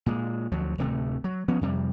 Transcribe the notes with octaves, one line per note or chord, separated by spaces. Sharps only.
A#2 G#3
D2 F3 F#3
D1 C3 A3
F#3
F3 B3 C#4
F2 C3 G3